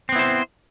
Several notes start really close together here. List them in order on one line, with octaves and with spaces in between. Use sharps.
C4 B3 E4 C5